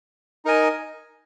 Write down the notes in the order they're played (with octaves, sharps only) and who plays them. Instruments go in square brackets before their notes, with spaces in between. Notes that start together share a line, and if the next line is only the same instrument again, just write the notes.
[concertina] D#4 A#4 D#5 G#5